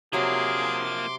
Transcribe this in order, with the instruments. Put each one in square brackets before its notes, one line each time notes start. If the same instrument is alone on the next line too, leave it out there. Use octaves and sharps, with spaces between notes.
[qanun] C3 F#3 B5 [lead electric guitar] F3 A#3 [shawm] G#4 [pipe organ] C6 D6